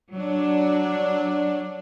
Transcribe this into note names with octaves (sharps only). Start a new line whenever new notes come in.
F#3 D4